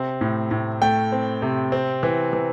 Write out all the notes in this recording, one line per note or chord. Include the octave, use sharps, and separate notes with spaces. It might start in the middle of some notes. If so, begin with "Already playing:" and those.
Already playing: C3 C4
A2
A2
A3 G5
C4
C3
C4
E3
E3